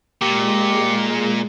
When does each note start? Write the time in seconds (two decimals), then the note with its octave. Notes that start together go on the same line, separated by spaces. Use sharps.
0.22 A#2 G#3 G4